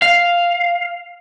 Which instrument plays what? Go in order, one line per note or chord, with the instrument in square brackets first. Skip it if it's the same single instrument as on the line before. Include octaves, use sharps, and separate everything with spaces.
[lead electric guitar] F5